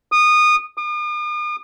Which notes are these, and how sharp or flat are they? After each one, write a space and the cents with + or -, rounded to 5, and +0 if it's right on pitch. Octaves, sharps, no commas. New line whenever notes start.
D#6 -20
D#6 -45